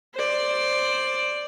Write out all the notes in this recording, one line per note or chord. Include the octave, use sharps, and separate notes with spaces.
C5 D5